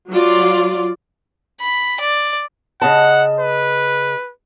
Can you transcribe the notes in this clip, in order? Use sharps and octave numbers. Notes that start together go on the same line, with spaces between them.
F#3 F4 D5
B5
D5
C#3 D#5 F#5 A5
B4